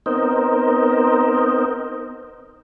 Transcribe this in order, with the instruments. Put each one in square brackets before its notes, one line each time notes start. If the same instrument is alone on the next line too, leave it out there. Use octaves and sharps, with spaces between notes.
[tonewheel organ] B3 C4 D#4 A#4 C5 D#5